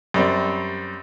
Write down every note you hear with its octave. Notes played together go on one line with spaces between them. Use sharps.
F#2 G3 C4